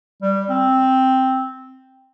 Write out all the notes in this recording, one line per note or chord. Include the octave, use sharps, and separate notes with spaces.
G3
C4